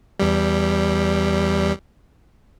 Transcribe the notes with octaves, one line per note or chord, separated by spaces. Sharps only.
E2 G3